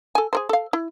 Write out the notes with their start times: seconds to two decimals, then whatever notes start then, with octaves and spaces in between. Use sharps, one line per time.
0.15 A4 G#5
0.33 G#4 A#4 C5
0.49 A4 F5
0.73 E4